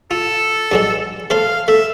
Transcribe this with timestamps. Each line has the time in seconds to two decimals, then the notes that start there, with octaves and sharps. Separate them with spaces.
0.11 F4 A4
0.72 G2 F#3 G#3
1.30 A3 A4 C5 F5
1.68 A3 E5